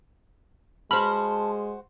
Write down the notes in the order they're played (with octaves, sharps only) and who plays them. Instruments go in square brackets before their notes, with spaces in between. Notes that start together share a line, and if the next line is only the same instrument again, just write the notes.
[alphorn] G#3 [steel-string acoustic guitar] F#4 C5 [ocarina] A5 [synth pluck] B5 F6